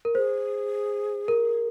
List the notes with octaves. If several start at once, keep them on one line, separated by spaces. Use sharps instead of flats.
A#4
G#4 C5
A#4